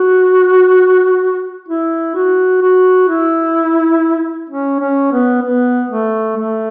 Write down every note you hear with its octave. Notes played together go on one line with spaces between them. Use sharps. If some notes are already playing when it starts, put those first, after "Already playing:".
Already playing: F#4
E4
F#4
F#4
E4
C#4
C#4
B3
B3
A3
A3